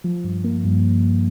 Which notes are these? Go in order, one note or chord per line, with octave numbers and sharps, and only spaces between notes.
F3
G2
A#3
G2